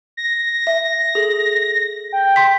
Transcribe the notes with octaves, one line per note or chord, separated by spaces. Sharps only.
A#6
E5
G#4 A4
G5
C6 B6